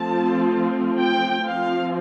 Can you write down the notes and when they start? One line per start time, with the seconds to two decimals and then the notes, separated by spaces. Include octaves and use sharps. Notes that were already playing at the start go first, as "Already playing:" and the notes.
Already playing: F3 A3 C4 F4 A5
1.00 G5
1.46 F3 C4 F4 F5